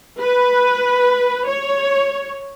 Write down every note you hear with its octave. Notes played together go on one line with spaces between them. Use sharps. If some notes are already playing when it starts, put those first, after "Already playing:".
B4
C#5